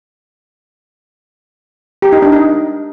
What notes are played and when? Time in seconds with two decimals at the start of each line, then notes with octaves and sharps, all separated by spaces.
2.02 G4
2.12 D#4
2.22 D4
2.32 D#4